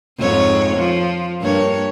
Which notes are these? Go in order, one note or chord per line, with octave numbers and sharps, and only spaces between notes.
F2 G#2 C#5
F3
G2 A#3 C#5